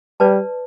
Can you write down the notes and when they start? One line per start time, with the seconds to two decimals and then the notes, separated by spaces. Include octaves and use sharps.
0.20 G3 B4 D5 A5